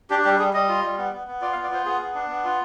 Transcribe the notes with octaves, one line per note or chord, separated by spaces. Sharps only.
D4 G4
G3 G4
G3 G#4
G3 D#5
F4
G3
B3
B3
B3
F4 D5
F5
B3
D5
F4 C5
B3 G#4
B3
D4
B3
F4